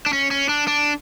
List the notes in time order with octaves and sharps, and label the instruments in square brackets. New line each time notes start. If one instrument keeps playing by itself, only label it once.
[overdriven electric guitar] D4
C#4
C#4
D4
D4